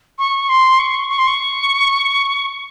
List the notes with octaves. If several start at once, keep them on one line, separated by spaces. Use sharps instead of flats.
C#6
C6
C#6
C#6
C6
C#6